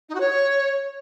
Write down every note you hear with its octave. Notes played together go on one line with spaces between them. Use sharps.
D#4
F#4
C#5